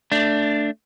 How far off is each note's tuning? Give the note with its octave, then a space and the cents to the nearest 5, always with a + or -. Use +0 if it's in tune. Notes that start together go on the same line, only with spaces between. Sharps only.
A3 +15 D4 +0